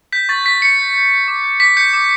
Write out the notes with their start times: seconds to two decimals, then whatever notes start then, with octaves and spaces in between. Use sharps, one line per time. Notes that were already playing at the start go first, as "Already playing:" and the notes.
0.13 G6 B6
0.29 C#6 A6
0.45 G6 B6
0.61 G6 C#7
0.79 G6
0.94 G6
1.11 G6
1.28 D6
1.43 G6
1.60 D6 B6
1.77 G6 C#7
1.93 D6